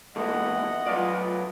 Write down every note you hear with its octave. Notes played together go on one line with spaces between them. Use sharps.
A#2 E3 G#3 A3 D#5 F#5
F#3 B3 F4 D5